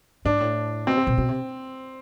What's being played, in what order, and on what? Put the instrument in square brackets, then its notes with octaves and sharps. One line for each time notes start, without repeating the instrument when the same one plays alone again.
[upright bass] G#2 [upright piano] D4
[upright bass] A2
[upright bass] B2 [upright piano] C4
[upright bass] C3
B2
B2
C3